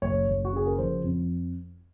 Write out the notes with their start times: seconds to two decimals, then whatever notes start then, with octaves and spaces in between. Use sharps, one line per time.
0.02 F#1 C#5
0.27 F#1
0.45 F#4
0.53 C#3 G#4
0.67 A#4
0.78 F3 C5
1.04 F2